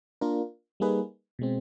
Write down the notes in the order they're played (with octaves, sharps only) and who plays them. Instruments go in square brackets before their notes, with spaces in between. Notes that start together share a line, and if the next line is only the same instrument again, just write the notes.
[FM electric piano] A#3 D4 F4 A#4
G3 A#3 D#4 G#4 B4
B2 G#3 C4